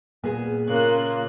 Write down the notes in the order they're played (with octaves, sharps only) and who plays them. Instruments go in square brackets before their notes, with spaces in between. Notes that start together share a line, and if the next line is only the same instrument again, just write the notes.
[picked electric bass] A#2 [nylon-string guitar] B3 G#4
[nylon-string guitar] C#3 [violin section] A#3 F4 F#6